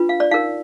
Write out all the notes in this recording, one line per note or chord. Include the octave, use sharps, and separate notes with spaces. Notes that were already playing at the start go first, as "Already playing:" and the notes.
Already playing: D4 F4 B4
F5
D5
D#4 A#4 F5